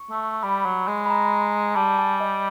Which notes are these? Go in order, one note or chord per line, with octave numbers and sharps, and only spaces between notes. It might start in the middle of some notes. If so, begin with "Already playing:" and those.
Already playing: C#6
A3
G3 B5
F#3
G#3
B5
A#5
G3 A5
G#5
D#5